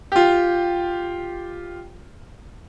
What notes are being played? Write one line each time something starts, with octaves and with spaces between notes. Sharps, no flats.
F4 G4